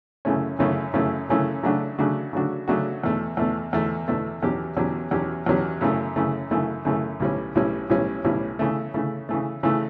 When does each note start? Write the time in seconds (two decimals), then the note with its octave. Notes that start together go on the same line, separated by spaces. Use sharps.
0.25 F#2 C#3 E3 A3 C#4
0.59 F#2 C#3 E3 A3 C#4
0.94 F#2 C#3 E3 A3 C#4
1.29 F#2 C#3 E3 A3 C#4
1.63 C#3 F#3 A3 D4 F#4
1.99 C#3 F#3 A3 D4 F#4
2.33 C#3 F#3 A3 D4 F#4
2.68 C#3 F#3 A3 D4 F#4
3.03 E2 B2 A3
3.37 E2 B2 A3
3.73 E2 B2 A3
4.08 E2 B2 A3
4.42 E2 B2 F#3 C#4 G4
4.77 E2 B2 F#3 C#4 G4
5.11 E2 B2 F#3 C#4 G4
5.46 E2 B2 F#3 C#4 G4
5.81 F#2 C#3 E3 A3
6.16 F#2 C#3 E3 A3
6.51 F#2 C#3 E3 A3
6.85 F#2 C#3 E3 A3
7.20 B1 A2 G3 C#4
7.55 B1 A2 G3 C#4
7.90 B1 A2 G3 C#4
8.24 B1 A2 G3 C#4
8.59 C#3 E3 A3
8.94 C#3 E3 A3
9.29 C#3 E3 A3
9.63 C#3 E3 A3